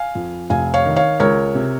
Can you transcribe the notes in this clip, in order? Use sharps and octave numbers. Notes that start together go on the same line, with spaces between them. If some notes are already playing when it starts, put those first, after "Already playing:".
Already playing: F5 G#5
F2
F1 F5 G#5
C#5 F5
D#3
C#5 F5
C#2 A#4 C#5
C3